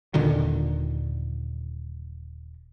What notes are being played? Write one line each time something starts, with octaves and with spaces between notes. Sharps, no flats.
D#1 A#2 D3 D#3